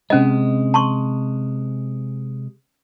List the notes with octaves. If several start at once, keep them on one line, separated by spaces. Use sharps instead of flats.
C3 G#3 C#4 D#5
A5 C6 C#6